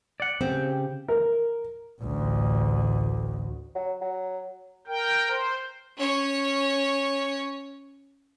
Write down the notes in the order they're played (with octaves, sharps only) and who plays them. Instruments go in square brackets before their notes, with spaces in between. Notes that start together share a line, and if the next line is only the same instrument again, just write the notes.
[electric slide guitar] D5 F#5
[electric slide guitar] C#3 G4 [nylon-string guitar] C4
[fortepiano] A#4
[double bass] A1 D2
[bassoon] F#3
F#3
[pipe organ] A#4 G5
C5
[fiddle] C#4 C#5